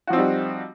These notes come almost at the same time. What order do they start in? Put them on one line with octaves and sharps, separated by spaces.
F#4 F3 C4 D#4 G3